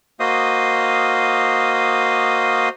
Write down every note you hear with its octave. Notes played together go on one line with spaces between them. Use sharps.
A#3 F#4 C5 D#5 F5 D#6